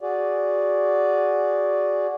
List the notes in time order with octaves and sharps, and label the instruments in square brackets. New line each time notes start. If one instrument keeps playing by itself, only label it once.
[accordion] F#4 G#4 D5